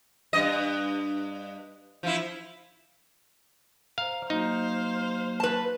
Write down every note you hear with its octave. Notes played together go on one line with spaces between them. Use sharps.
G2 D#5
F3 E4
C5 F5 A#5
F#3 A#3 D#4 F#4 C5 F5
B4 A5